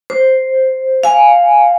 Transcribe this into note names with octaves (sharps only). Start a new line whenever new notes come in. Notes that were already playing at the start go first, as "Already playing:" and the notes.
C5
F5 G#5